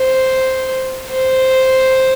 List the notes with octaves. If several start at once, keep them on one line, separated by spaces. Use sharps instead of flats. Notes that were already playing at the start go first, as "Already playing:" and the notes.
Already playing: C5
C5